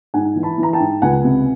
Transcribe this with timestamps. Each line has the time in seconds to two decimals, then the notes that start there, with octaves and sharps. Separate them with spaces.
0.14 G#2 F#5 G#5
0.36 E3
0.43 A5 B5
0.58 E3
0.63 A#5
0.73 G5 A5
0.80 G#2
1.02 C#2 F#5 G#5
1.24 C3